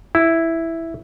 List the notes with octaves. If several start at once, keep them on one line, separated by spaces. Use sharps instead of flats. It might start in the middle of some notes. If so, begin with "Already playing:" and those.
E4